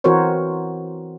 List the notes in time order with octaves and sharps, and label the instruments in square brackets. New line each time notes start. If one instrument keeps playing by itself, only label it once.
[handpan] E3 C4 F#4 A#4 C5 C#5